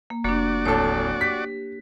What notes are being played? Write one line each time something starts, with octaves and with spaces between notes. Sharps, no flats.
A#3
F1 A#3 D4 F#4 D5
D1 A4 C#5
G4 B6